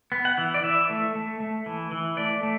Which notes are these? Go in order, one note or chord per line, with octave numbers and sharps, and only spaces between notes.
B3
F#5
E3
D5
E3 E5
A3
A3
A3
E3
E3
A3 D5
A3